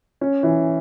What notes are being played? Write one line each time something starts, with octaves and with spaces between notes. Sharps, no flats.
C#4
E3